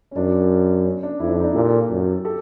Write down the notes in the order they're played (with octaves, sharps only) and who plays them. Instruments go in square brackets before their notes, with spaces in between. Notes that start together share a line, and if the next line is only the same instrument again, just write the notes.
[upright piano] C#4
[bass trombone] F#2 [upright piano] D4
[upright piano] C#4
D4
[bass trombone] F2 [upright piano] D4 E4
[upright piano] D4 E4
D#4
D4 E4
[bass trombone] A#2 [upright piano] G4 A4
[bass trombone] F#2
[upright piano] G4 A4